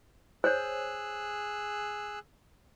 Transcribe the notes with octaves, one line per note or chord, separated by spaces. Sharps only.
G#4 C5 C#5 E6 F#6